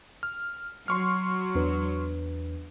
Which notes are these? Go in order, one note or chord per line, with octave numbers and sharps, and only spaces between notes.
F6
F#3 C6 C#6 F6
E2 D4 B4